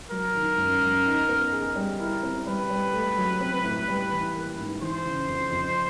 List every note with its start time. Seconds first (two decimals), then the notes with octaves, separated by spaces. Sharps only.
0.11 F#3 A#4
0.35 D#3
0.58 F#2
0.82 F#2
1.05 D#4
1.29 B3
1.53 G#4
1.76 G3
1.99 E4 A#4
2.23 C4
2.46 G3 B4
2.70 G3
2.94 A3
3.17 F#3
3.41 C4
3.64 A2
3.88 G3
4.11 E3
4.35 A#3
4.58 G#2
4.82 E3 C5
5.05 C#3
5.29 F2
5.52 F2